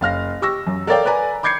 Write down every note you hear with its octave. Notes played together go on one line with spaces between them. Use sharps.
F#1 F5 F6 A#6
G4 C#6 E6 A#6
F#2
A4 A#4 C#5 D5 F5 G5
B4 D5 G#5 A#5
B5 D6 G6 G#6 C7 C#7